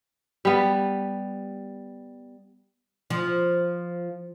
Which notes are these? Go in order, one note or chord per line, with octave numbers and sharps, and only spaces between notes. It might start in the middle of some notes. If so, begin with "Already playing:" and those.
G3 B3
F3